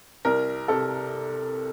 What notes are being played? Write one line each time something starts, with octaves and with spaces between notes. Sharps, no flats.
C2 A#4
C3 A4